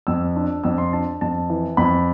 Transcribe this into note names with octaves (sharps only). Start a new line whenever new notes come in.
F2 E6
D4
F2 E6
C6
D4 A5
F2 A5
E3
F2 B5